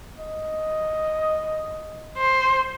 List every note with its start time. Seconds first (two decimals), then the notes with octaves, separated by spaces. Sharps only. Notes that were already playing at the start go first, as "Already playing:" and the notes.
0.19 D#5
2.18 C5